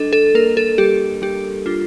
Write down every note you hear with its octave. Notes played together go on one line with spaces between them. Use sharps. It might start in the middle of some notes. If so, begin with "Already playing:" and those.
Already playing: G3 D4 A4 D#5
A4
A#3 A#4
A4
G3 G4
G3 G4
D4 F4